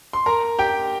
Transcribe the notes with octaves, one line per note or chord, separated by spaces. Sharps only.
C6
A#4 A#5
G4 G5